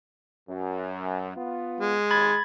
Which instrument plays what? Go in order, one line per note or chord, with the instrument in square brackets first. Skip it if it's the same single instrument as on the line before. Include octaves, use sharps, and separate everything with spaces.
[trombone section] F#2
B3 F4
[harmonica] G#3
[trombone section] G#1 D#2 [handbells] B5 G#6 A6